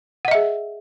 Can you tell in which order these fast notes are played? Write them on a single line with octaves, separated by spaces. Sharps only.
F#5 D#5 E5 G#4